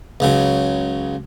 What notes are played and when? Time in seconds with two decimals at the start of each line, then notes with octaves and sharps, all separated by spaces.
0.20 C#2 C#3 F#3